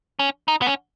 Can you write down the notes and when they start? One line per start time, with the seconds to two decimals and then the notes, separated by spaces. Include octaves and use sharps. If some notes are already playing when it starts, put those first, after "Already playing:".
0.19 C#4
0.48 D#4
0.62 B3
0.67 C#4